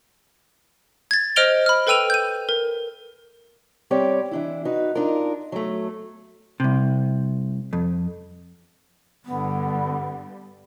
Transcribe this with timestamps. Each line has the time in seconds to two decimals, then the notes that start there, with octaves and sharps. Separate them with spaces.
1.11 G#6 A6
1.36 C5 D#5 F6 D7 F7 G7
1.66 B5 F6
1.87 A4 B4 G5 E6 D#7 F7
2.10 G6 D#7
2.49 A#4
3.91 G3 C4 G4 C#5 D5
4.31 E3 D4 E4
4.65 D#4 F#4 B4
4.95 D4 D#4 F4 A#4
5.52 F#3 A3
6.60 C2 C3
7.73 F2
9.25 G2 D3 G3 B3